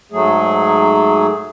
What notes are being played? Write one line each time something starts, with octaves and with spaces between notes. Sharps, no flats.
G#2 F#3 A3 G#4